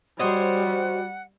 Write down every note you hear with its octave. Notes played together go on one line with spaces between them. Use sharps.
G3 F#4 C5 C#5 D#5 F#5